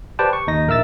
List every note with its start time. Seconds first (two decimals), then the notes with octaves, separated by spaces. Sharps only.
0.19 G4 B4 C5 D5 G5 A5
0.33 C#6
0.47 D#2 D#4 A#6
0.67 A#1 A#4 E5 E6 A6